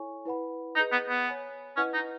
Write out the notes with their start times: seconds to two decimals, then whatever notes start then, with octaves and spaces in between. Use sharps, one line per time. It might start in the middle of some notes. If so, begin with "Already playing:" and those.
Already playing: E4 A4 C#5 G#5 C#6
0.25 E4 B4 F#5 B5
0.76 D#4 G#4 B4 D#5
0.92 B3
1.09 B3
1.26 C#5 G#5 B5
1.77 C#4 E4 B4 D#5 F#5
1.94 D#4